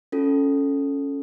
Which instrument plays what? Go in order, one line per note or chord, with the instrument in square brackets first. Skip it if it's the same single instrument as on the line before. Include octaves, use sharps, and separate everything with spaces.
[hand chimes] C#4 F4 A4